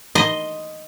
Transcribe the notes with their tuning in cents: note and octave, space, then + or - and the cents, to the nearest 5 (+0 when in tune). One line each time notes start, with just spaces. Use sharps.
D#5 +0 C6 +0